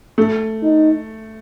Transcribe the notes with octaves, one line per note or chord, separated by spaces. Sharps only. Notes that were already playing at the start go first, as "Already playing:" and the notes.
A3
D#4